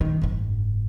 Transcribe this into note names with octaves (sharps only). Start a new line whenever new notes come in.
A#2 D#3
F#1 G#2